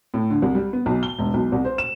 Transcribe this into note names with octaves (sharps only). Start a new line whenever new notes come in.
A2
D3
C2
G3
B3
B1
G7
E1
B1
C2
C5
E7